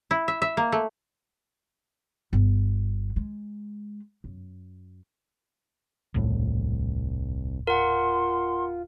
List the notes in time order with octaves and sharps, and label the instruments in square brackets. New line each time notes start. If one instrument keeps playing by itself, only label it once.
[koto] E4
E5
E5
A#3
A3
[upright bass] G1
G#3
F#2
[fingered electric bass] D#1 A2 [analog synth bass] C2
[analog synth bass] F4 [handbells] A#4 F#5 [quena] C6